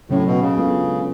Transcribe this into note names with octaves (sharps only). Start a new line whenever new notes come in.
A2 C#3 F#3 C#4
B2
C#3
G#3 B3 D4 F4 A4